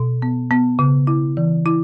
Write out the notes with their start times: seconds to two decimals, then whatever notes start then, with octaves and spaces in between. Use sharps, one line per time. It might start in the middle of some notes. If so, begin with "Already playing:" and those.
Already playing: B2
0.22 B3
0.51 B3
0.79 C#3
1.07 E4
1.37 E3
1.66 E4